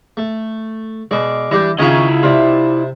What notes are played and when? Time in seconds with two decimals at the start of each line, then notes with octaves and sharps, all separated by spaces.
0.17 A3
1.11 B2 G#3 D5
1.51 E3 G3 D4 G4
1.79 C#2 D#3 C#4 E4 F4 G#4 D#5 F5
2.23 C3 F4 D5 E5